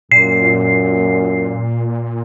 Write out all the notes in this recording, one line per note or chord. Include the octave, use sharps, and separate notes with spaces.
F#2 A#2 C7